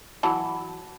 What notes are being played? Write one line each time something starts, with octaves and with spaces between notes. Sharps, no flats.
E3 F#3 A5